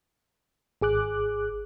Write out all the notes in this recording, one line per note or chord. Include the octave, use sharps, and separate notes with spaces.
G#1 G#4 D6 F#6